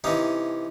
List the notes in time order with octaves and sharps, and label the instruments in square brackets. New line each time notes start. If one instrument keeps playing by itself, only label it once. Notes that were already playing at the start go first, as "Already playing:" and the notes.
[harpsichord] C3 E3 C#4 D#4